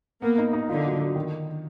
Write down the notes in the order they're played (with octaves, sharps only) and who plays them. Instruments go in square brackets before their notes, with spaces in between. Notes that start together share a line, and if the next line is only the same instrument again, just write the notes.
[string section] A#3 [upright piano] B3
[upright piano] D#4
D#4
[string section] D3 [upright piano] F4
[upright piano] F#3
F#3
D#3